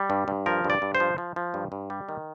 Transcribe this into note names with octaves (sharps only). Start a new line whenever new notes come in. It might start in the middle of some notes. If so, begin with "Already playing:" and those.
Already playing: G3
G2
G2
F3 A#4
G2
D5
G2
C5
F3
F3
F3
G2
G2
G3
D#3